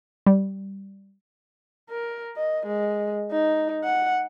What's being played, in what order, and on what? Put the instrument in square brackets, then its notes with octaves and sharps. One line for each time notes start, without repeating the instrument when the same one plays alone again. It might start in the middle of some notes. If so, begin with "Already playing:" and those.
[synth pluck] G3
[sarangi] A#4
D#5
G#3
D#4
F#5